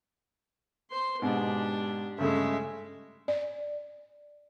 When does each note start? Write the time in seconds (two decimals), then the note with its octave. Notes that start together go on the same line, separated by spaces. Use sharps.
0.91 C5 C6
1.22 G#2 B2 D4 G4
2.18 G2 C#3 G#3 A3 E5
3.28 D5